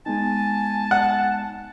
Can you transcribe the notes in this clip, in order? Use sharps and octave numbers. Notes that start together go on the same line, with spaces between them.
G#3 B3 D#4 G#5 A5
F#5